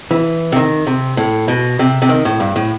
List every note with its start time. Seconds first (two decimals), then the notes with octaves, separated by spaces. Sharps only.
0.11 E3
0.52 C3
0.56 D#3
0.87 C3
1.17 A2
1.48 B2
1.79 C3
2.02 C3
2.09 D#3
2.25 A2
2.40 G2
2.56 A2